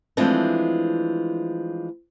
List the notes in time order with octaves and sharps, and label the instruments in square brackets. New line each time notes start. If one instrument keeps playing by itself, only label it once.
[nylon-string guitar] E3 F3 G#3 A3 C4 D4